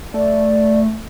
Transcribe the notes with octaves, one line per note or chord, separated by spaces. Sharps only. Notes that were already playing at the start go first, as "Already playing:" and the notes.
A3 D5